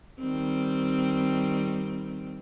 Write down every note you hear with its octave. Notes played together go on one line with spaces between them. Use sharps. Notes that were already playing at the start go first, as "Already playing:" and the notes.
D#3 G3 C4